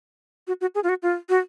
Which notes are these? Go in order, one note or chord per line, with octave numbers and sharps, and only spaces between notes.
F#4
F#4
G#4
F4
F#4
F4
F#4